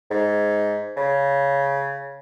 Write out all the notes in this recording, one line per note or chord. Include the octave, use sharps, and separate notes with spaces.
G#2
C#3